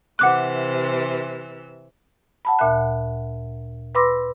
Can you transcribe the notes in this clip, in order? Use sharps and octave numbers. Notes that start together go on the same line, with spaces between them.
C3 E3 F#5 D6 E6 F#6
F#5 A5 B5
D2 A#2 E5 F#6
B4 B5 C6 D6 E6 A#6